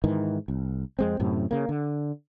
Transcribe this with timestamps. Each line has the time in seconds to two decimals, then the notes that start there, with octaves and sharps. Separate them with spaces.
0.04 G#2 D#3 E3
0.48 C2
0.99 F2 G#3 C4
1.20 F#2 A2 C3
1.51 C#3 A#3
1.69 D3